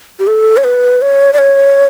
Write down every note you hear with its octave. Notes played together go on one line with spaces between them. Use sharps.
G4
A4
C#5
B4
C#5
D5
C#5